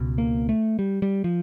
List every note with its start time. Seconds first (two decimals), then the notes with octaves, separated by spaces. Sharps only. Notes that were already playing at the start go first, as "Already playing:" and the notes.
Already playing: C#2 B2
0.18 A#3
0.49 A3
0.79 G3
1.02 G3
1.24 F3